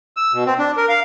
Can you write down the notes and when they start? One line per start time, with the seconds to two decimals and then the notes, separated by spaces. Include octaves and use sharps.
0.17 E6
0.33 B2
0.46 C4
0.59 D4
0.77 A#4
0.89 F5